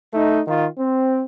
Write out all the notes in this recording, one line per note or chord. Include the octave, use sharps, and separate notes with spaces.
A3 D#4
D#3 F4
C4